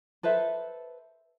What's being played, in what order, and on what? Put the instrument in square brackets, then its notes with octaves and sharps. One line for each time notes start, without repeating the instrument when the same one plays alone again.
[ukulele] A4 B4 C5 E5